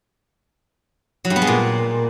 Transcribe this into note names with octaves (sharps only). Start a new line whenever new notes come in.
F#3
G2
B3
G#3
A#2